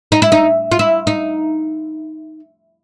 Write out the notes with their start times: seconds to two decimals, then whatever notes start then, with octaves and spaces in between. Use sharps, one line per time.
0.12 D#4
0.22 E4
0.32 D#4
0.72 F4
0.79 E4
1.07 D#4